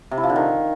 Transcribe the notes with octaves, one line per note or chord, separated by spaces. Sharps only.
C3
E4
F3
D3
D#3